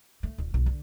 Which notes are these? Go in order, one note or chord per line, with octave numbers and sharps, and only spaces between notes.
A3
D1
B1
D3